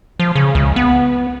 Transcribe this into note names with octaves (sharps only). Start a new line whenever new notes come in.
F3
C#3
C#2
B3